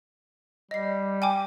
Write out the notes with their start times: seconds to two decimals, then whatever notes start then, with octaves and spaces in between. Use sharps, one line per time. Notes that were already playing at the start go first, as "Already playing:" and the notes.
0.71 G3 D#5 C7
1.22 G5 G#5 D6